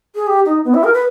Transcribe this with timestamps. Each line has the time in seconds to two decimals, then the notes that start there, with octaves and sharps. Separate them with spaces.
0.15 G#4
0.27 G4
0.46 D#4
0.65 B3
0.74 E4
0.84 A#4
0.94 B4